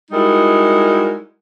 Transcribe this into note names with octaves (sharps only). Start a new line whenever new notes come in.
G3 G#3 D#4 E4 F#4 A#4